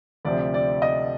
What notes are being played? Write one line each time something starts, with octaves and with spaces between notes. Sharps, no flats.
D2 C3 F3 C4 D5
D5
D#5